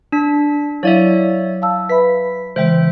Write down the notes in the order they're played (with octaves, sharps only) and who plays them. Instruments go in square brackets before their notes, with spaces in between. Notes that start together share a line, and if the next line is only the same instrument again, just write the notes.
[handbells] D4 B6
[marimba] F#3 E4 F5 [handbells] C#5 D5 E5
[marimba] F5 A5 E6
[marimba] B4 E5 B5 [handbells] B6
[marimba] C#3 E3 G#3 [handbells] C5 E5 G5